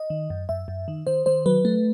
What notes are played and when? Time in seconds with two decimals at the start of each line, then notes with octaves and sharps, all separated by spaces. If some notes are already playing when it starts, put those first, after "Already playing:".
Already playing: D#5
0.10 D#3
0.30 F#2
0.49 F#2 E5
0.68 F#2
0.88 D#3
1.07 D#3 C5
1.26 D#3 C5
1.46 F#3 B4
1.65 A3